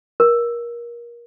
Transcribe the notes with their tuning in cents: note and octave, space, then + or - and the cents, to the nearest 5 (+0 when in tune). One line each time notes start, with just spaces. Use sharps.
A#4 +25